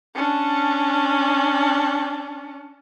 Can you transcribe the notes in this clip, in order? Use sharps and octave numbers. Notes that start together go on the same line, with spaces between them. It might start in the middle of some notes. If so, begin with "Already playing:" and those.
C#4 D4